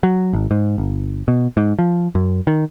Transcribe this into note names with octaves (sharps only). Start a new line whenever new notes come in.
F#3
G#1
G#2
G1
B2
G#2
F3
F#2
D#3